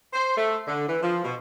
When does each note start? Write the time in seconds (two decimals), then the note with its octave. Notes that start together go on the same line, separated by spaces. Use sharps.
0.13 C5
0.38 A3
0.68 D3
0.88 E3
1.03 F3
1.25 B2